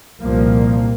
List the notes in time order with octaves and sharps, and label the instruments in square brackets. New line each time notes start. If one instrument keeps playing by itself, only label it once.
[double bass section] C2 A#2 F3 A#3